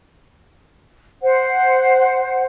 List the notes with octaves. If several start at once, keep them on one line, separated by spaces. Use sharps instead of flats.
C5 F#5